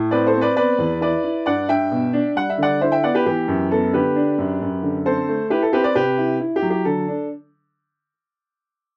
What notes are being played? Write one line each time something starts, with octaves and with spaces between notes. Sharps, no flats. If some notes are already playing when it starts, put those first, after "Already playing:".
Already playing: A2
C4 B4 D5
A4 C5
C4
B4 D5
B3 B4 D5
E2
E4 B4 D5
E4
G2 D5 F#5
G2 E5 G5
B2
D4
G3 F#5
E5
D3 D5 F#5
E4 C5 E5
E5 G5
B3 D5 F#5
G4 B4
E3 G4
F#2
B3 A4
D3 G4 B4
D4
F#2
F#2
D3
C4 A4 C5
A3
E4 G4 B4
A4
C4 G4 B4
B4 D5
C3 G4 B4
E4
E4
G4
F#3
G4
D3 A4
D4